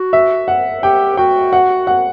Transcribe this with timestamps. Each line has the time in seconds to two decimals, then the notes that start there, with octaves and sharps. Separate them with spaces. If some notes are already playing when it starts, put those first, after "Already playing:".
Already playing: F#4
0.13 E5
0.48 F#5
0.83 G4 G5
1.17 F#4 G5
1.53 F#5
1.87 F#5